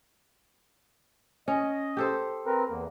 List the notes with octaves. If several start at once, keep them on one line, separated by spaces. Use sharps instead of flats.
C#4 D#5
G4 A4 C5
C4 A#4 B4
E2 A#3